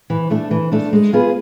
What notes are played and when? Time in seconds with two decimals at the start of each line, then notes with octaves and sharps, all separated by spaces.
0.10 E3
0.31 A3 D4
0.51 E3
0.72 A3 D4
0.93 G#3
1.13 B3 F4 G#4 B4